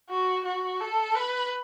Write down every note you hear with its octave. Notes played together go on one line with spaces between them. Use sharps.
F#4
F#4
A4
B4